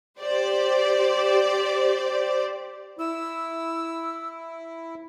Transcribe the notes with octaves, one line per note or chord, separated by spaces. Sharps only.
G4 C5 D5
E4 E6